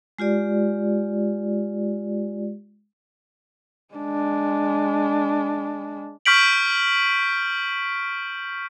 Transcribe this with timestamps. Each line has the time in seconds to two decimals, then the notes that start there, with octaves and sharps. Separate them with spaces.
0.19 G#3 F4 G4 D5
3.94 G#3 D4
6.26 C#6 F6 G6 B6 D7 F#7